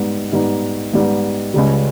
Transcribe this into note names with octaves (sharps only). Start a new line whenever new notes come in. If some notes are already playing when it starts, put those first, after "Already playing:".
Already playing: G#2 G3 B3 D#4
G#2 G3 B3 D#4
G#2 G3 B3 D#4
C#2 C#3 G3